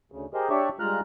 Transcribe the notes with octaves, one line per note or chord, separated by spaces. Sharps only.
D2 C#3
G4 G#4 A#4 C5 D#5
D4 G4 C#5 D5 E5 C#6
G2 G#3 F4 A#5 F6 F#6